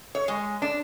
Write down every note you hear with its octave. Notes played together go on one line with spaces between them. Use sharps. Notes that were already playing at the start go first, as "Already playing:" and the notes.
C#5
G#3
D4